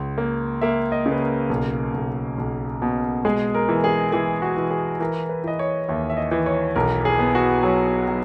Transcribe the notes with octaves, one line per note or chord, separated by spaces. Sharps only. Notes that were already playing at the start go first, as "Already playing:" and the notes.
Already playing: C#2
A#3
A#3 E5
D#5
C#3
B4
A#4
B1
B1
B1
B2
G#3 G#4
A#4
E3
G#4
E3 G#4
F#4
E3
G#4
E3 A#4
B4
E3 D#5
C#5
D#2 E5
E5
D#5
E3
C#5
B1 A#4
G#4
B3
F#4
F#3
F#3